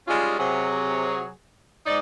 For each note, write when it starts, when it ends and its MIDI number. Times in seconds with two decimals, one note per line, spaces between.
0.08 0.37 55
0.08 0.37 56
0.08 0.37 61
0.08 0.37 63
0.08 0.37 65
0.08 0.37 68
0.39 1.30 48
0.39 1.30 54
0.39 1.30 68
1.86 1.99 44
1.86 1.99 63
1.86 1.99 74